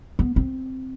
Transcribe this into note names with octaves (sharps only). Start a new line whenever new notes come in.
B3
C4